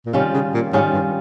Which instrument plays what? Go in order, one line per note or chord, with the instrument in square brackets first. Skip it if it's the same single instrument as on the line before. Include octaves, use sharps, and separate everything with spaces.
[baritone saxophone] A#2
[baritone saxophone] C3 [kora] D#3 G3 C#4 F4
[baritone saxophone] C#3
A#2
[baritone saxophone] G#2 [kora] D#3 G3 C#4 F4
[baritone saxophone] G2